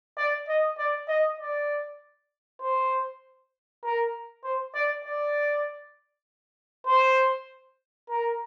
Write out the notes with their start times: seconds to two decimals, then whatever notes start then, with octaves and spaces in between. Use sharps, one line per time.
0.18 D5
0.48 D#5
0.78 D5
1.09 D#5
1.40 D5
2.62 C5
3.83 A#4
4.44 C5
4.75 D5
5.05 D5
6.87 C5
8.09 A#4